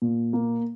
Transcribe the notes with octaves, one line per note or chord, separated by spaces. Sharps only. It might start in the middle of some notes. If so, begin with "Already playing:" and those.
A#2
A#3